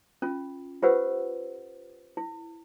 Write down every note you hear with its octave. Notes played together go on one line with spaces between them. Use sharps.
C#4 F4
F4 G4 B4 C5 F#5 E6
E4